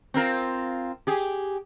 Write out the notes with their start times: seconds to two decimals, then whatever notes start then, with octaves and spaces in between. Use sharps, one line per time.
0.14 C4 F4 A#4
1.07 G4 G#4